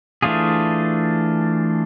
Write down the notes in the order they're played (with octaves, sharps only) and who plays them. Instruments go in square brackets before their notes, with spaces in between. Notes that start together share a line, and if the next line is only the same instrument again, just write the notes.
[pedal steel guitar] E3 A3 D4 F4 G#4